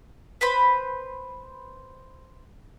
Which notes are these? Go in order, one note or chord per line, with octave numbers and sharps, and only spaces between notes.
B4 C5 B5